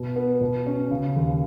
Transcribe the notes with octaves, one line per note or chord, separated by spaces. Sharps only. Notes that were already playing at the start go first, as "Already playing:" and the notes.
Already playing: B2
B3
B2
C#4
C#3
D#2